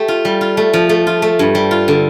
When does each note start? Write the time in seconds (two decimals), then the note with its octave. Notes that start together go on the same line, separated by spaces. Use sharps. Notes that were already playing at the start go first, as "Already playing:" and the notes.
Already playing: A3 G4
0.08 F4
0.25 G3
0.41 F4
0.57 A3
0.74 F3
0.89 A3
1.07 F4
1.22 A3
1.39 G2
1.55 G3
1.71 F4
1.88 D3